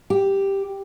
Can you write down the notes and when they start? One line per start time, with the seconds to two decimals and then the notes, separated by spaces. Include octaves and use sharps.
0.10 G4